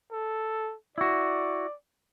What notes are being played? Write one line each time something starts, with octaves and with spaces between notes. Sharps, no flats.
A4
E4 F#4 D5